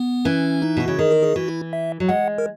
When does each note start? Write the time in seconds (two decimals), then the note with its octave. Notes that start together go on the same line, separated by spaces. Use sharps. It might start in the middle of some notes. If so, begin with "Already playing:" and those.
Already playing: B3
0.25 E3 C#4
0.62 D#4
0.77 B2 F#4
0.88 C#3
0.99 D#3 G#4
1.11 A#4
1.23 G#4
1.36 E3 F#4
1.48 E4
1.73 E5
2.00 F#3
2.09 G#3 F#5
2.38 A#4